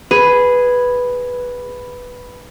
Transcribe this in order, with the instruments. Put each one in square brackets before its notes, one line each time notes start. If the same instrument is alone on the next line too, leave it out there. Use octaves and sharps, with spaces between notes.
[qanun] G#4 [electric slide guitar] B4